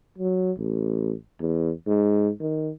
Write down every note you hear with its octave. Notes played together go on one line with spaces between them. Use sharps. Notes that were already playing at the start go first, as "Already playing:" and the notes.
F#3
A1
E2
G#2
D#3